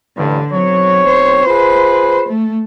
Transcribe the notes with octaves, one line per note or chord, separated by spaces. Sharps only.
A1 G2 D3
B1 F#3 C4 C#5
C5
F4 G#4 B4
A3